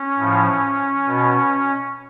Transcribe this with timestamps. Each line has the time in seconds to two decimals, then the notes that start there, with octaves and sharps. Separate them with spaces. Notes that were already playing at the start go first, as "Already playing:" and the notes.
Already playing: C#4
0.18 A2 F3
1.06 B2